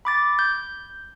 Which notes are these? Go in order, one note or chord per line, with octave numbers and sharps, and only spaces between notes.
B5 D6 A6
G6